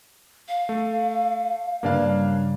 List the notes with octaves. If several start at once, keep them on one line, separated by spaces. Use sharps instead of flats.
F5
A3
G2 C#3 A#3 D4 F5